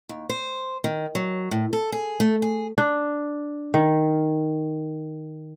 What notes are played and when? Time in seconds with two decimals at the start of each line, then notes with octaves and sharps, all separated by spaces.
0.09 D#2
0.29 C5
0.84 D#3
1.15 F#3
1.51 A2
1.73 A4
1.92 G#4
2.20 A3
2.42 G#4
2.78 D4
3.74 D#3